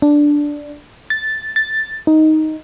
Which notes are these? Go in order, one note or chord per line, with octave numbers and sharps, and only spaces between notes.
D4
A6
A6
D#4